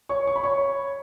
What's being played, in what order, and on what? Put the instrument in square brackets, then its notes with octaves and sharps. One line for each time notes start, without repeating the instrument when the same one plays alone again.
[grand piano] C#5 C#6
C#6
B5
C#5 C#6